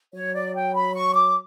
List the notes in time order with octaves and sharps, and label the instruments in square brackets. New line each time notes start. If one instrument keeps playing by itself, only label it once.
[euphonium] F#3 [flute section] C#5
[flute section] D5
G5
B5
C#6
D6